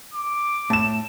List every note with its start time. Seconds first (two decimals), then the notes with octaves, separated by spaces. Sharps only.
0.14 D6
0.70 A2 A5 E7